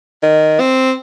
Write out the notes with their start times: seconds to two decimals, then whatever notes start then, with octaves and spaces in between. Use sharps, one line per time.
0.23 D#3
0.60 C4